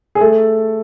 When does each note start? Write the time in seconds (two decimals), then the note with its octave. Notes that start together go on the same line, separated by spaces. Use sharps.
0.15 G#4
0.20 A3 A4